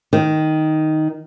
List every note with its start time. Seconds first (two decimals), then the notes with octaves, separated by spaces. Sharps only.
0.13 D#3